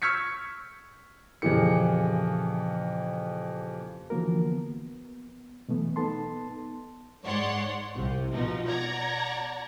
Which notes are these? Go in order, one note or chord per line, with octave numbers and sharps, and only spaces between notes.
C#6 E6 F6 G#6 B6 C#7
F2 A#2 C#3 E3 G4 C#7
D3 E3 F3 A#3 F#4 A#4
B3
B2 E3 F#3 A3 B3
B3 D#4 A4 A5 C6
G#2 C#5 D5 F#5 C6
C2 C3
B2 F3 D#4
D5 F#5 A#5 G#6